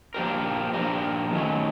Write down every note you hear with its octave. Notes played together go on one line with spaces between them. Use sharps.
F3 A#3 D4 G4 A#4
F3 A#3 D4 G4 A#4
D#3 F#3 A3 C#4